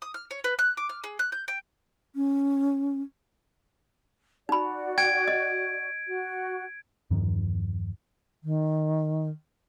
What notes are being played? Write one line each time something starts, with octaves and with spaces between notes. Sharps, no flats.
D#6
F6
C#5
B4
F#6
D6
F6
G#4
F#6
G6
G5
C#4
D#4 F#4 D5 B5
G5 G#6 D7
D#5
F#4
E2 G2 D#3 F3
D#3